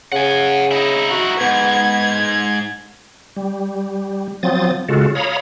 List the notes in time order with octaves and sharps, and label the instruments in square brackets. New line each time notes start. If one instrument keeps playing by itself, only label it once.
[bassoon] C#3 [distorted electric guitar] F#5 G#5
[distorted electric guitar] D#4 E4
[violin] F#4
[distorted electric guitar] G#2 [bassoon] B3 [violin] G#6
[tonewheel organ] G3
F3 F#3 C4 D#6 A6
C#3 G#3 F4 F#4 A4
C#5 F5 A#5 B5 D#6